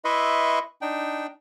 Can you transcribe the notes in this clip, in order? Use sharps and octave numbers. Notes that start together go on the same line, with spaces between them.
E4 B4 D#5 E5 C6 C#6
D4 D#4 G5